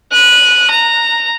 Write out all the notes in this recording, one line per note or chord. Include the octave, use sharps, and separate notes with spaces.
F#6 D#7
A#5